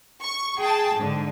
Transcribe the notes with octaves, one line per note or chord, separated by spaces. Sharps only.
C#6
G#4 G5 A5
G#2 D3